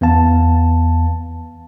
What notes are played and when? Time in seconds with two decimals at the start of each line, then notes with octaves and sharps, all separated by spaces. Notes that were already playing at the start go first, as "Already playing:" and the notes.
0.01 E2 B3 F5 A5